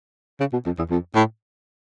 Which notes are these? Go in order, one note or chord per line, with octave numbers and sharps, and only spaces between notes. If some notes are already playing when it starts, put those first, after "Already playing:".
C#3
B2
F2
E2
F2
A2